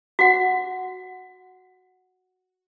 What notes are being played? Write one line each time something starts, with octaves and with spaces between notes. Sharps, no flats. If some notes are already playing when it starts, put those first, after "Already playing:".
F#4 F#5